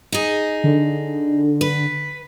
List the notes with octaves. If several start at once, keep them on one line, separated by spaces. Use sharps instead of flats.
D#4 G#4
D3
B4